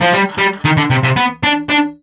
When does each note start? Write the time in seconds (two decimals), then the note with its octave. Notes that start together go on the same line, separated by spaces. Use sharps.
0.01 F3
0.13 G3
0.38 G3
0.65 D#3
0.77 D3
0.90 C3
1.03 C3
1.16 B3
1.43 D4
1.69 D4